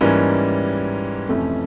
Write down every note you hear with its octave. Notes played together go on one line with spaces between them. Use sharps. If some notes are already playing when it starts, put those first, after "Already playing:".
G#2 E3 G3 A#3 C#4
F2 C3 E3 A3 C#4